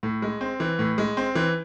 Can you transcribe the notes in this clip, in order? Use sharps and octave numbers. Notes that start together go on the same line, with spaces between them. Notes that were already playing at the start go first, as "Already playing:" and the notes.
A2
G#3
C4
E3
A2
G#3
C4
E3